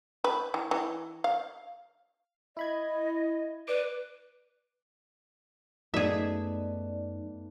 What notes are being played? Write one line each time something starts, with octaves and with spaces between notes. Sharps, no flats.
B4
E3
E3
F5
E4 D#5 B5 G#6
B4 D5 D6
F#2 A3 B3 D#4 G#4 D5 E5